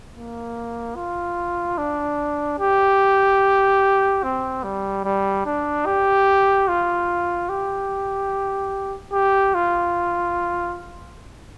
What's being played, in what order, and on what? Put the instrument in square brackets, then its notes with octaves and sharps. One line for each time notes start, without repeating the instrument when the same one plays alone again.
[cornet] A#3
F4
D4
G4
C4
G3
G3
D4
G4
F4
G4
G4
F4